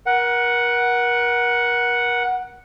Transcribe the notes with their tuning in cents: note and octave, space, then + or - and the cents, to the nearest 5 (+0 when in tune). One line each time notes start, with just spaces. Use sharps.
A#4 +35 F#5 +0